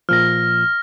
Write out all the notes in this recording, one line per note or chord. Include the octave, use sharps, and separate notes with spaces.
A#2 F3 F6 A#6